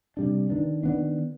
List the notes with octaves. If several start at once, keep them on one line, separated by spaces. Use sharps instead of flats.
C3 G3 D4
D#3 B3 D4
D#3 B3 D4